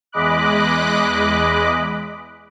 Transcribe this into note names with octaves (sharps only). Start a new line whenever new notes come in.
E2 G#3 D#5 B5 D6 F#6